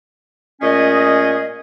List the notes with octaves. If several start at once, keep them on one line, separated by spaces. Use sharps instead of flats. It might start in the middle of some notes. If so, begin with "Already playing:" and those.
A#2 A3 C#4 G#4 D#5